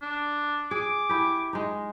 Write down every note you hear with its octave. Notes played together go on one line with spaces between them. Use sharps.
D4
G#4 D6
E4 G4
G#3 D#4